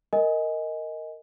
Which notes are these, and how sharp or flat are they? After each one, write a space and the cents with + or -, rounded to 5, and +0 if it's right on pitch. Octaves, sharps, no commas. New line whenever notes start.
A#4 -10 D#5 +15 G#5 +0